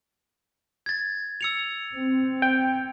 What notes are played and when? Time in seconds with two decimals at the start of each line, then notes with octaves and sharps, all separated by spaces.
0.86 G#6 A6
1.41 E6 C#7 F7
1.94 C4
2.42 G5